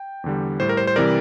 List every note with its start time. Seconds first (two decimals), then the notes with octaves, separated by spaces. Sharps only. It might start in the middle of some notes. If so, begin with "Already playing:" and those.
Already playing: G5
0.24 E2 D3 G3
0.60 A2 G3 C5
0.69 A#4
0.77 C5
0.87 C5
0.96 C3 E3 G3 A#4 D5